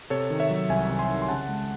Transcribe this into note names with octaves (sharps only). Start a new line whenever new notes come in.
C3 A4 C#5
D#3
C#5 E5
F#3
C2 E5 G#5
C3
G#5 C6
D#3
C6
C#3 F#5 A5
G#3